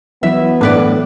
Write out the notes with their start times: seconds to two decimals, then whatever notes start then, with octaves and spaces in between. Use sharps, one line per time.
0.23 E3 F#3 B3 E4 E5
0.61 A2 D4 B4 D5